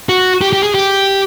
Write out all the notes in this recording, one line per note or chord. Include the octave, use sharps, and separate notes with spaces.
F#4
G4
G4
G#4
G4